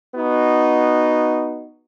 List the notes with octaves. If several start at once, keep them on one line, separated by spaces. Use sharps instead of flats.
B3 D#4 F#4